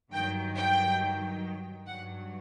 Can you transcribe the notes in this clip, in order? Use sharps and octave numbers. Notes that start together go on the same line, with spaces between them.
G2 D#3 F#3 G5
G5
G2 F#3 F#5